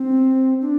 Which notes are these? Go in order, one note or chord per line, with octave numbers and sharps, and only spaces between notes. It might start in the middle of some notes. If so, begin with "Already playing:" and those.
Already playing: C4
D4